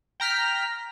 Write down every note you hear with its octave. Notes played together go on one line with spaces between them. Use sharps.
G5 A#5 F6 B6